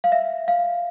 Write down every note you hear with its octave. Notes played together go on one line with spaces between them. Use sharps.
F5
E5
F5